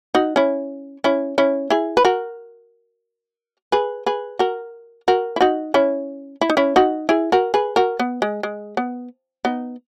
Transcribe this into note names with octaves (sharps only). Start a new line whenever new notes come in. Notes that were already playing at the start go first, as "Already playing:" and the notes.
D#4 F#4
C#4 E4
C#4 E4
C#4 E4
E4 G#4
B4
F#4 A#4
G#4 B4
G#4 B4
F#4 A#4
F#4 A#4
E4
D#4 F#4
C#4 E4
E4
D#4
C#4 E4
D#4 F#4
E4 G#4
F#4 A#4
G#4 B4
F#4 A#4
B3
G#3
G#3
B3
B3 D#4